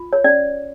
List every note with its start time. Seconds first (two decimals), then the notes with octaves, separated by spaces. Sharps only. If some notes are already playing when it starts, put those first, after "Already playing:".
Already playing: F4
0.13 C#5
0.24 C#4 D5